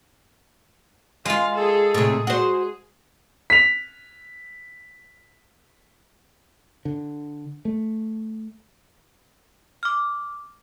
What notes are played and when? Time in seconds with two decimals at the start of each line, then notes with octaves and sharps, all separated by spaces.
1.25 G#3 F4 F5
1.56 G#4 A4
1.94 A2 C3 G#4
2.27 F#4 C5
3.50 B6 F7
6.85 D3
7.65 A3
9.83 D6 F6